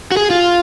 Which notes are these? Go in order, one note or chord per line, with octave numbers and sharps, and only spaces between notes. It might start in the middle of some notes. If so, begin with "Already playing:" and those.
F#4
G#4
F4